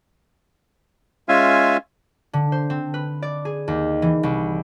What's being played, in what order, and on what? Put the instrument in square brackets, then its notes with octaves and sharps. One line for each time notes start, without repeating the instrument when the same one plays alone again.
[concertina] G#3 C#4 F4 E5 F5 G#5
[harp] D3
C5
C4
B4
D5
G#4
D#2
E3
C2